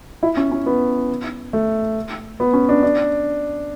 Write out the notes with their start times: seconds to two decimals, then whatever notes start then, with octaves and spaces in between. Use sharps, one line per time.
0.23 E4
0.37 C#4
0.52 C#4
0.66 B3
1.53 A3
2.40 B3
2.53 C#4
2.69 D4
2.83 D4